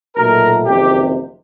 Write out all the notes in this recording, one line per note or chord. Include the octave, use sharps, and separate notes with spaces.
B1 A#2 F#3 A3 A#4
F#1 F2 C3 D#3 G4